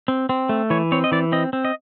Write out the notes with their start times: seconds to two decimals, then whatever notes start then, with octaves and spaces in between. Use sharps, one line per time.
0.08 C4
0.29 C4
0.49 A3
0.70 E3 C#5
0.92 C4 C#5
1.04 D#5
1.12 E3 D5
1.32 C4 D#5
1.53 C4
1.65 D#5